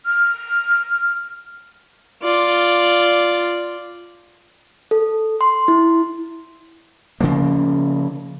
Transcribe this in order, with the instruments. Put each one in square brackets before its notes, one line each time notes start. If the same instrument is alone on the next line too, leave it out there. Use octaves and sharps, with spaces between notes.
[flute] F6
[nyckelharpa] F4 D5
[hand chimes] A4
C6
E4
[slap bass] C#3 F3 A#3